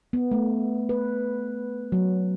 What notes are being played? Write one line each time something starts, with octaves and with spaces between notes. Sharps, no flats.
B3
A3
B4
F#3